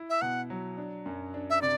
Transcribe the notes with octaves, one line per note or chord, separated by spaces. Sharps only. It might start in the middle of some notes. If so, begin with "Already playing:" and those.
Already playing: E4
E5
B2 F#5
F#3
D4
F#2
D4
E5
C3 D5